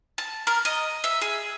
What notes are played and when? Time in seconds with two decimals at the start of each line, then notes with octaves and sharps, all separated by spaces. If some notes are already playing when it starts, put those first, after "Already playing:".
0.18 A5
0.47 A#4
0.65 D#5
1.04 E5
1.22 G#4